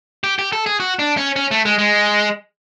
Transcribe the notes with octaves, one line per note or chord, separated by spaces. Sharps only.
G4
G4
A4
G#4
F#4
D4
C#4
C#4
A3
G#3
G#3